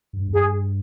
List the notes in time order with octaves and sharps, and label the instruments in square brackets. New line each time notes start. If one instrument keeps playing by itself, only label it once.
[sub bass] G2
E2
[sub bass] G2 [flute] G#4